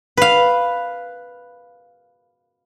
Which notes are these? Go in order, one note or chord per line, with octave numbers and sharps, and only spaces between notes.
B4 F5